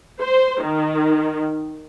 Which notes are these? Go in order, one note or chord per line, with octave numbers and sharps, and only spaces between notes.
C5
D#3